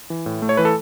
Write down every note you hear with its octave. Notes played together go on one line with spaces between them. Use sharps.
E3
A2
A3
C#5
E3 B4
A4